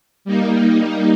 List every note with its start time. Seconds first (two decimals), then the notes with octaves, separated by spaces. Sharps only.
0.25 G3 A#3 D#4